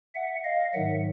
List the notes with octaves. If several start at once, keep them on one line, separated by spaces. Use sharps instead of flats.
E5 F#5
D#5 F5
G#2 D#3 F#3 E5 F#5